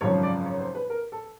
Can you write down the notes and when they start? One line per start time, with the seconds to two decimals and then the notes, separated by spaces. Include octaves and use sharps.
0.01 G#1 F#2 C#3 F3 C#5
0.23 D5
0.46 C#5
0.60 C5
0.75 B4
0.90 A#4
1.12 A4